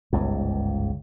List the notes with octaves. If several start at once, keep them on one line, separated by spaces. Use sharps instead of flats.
G1 C#2 G#2